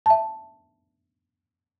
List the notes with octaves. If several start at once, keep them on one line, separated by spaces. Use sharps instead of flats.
E5 A5